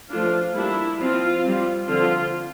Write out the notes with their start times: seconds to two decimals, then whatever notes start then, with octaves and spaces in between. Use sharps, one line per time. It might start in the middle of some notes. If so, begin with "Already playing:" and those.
0.11 F3 A3 D4 F4
0.55 G3 A#3 D4 E4
1.00 F3 C4 F4
1.44 G3 C4
1.88 D3 F3 C4 F4